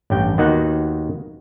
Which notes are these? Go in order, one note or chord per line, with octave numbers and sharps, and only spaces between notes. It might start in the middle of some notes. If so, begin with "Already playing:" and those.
A1 G2 G5
D#2 D#3 B3 D#4 F#4 F#5